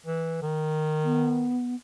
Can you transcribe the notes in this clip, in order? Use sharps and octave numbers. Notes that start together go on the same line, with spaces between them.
E3
D#3
B3